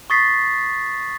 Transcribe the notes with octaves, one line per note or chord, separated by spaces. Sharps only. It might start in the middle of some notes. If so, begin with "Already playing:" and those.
C#6 D#6 A6 B6 C7